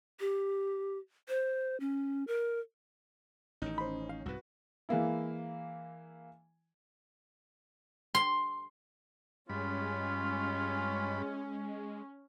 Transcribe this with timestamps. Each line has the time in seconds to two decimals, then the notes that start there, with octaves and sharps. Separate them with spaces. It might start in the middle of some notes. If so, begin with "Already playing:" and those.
0.20 G4
1.28 C5
1.80 C#4
2.27 A#4
3.62 A1 D#3 C#4 D#4
3.78 C5 B5
4.09 F5
4.26 C2 G#2 F#4 B4
4.89 E3 G#3 A#3 E4
8.15 C6
9.50 G2 G#3 C#4 F4 B5